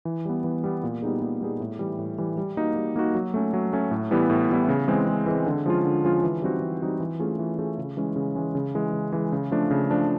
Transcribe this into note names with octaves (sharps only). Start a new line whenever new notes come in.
E3
G3 B3
E3
G3 B3
A#2
G3 B3 D#4 G#4
A#2
G3 B3 D#4 G#4
A2
E3 G3
A2
E3 G3
G3
A#3 D#4 F#4
G3
A#3 D#4 F#4
F#3
A3 C#4
F#3
A3 C#4
A2
E3 G3 B3 E4
A2
E3 G3 B3 E4
C#3
E3 G#3 C4
C#3
E3 G#3 C4
D3
F3 G#3 C#4 F4
D3
F3 G#3 C#4 F4
E3
G3 C4 D#4 F#4
E3
G3 C4 D#4 F#4
E3
A3 C#4 F4 G#4
E3
A3 C#4 F4 G#4
C#3
E3 G#3 C#4
C#3
E3 G#3 C#4
C#3
E3 G#3
C#3
E3 G#3
C#3
F3 A3 D4
C#3
F3 A3 D4